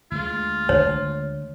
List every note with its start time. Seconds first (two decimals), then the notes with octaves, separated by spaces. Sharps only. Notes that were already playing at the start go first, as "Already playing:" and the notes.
0.11 D2 G#3 F4
0.69 D3 C#5